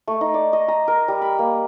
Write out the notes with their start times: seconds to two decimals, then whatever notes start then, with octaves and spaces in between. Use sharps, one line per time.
0.07 A3
0.21 D#4
0.34 D5
0.53 D#5
0.68 A#5
0.88 A#4
1.08 G3
1.22 B5
1.39 A#3